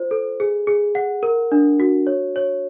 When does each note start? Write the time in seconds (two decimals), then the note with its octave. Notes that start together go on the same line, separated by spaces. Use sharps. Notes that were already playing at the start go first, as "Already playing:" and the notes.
Already playing: F4 C5
0.11 A4
0.40 G#4
0.67 G#4
0.95 F#5
1.23 A#4
1.52 D4
1.80 F#4
2.07 C#5
2.36 C#5